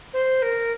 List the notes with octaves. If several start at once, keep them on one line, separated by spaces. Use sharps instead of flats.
C5
A#4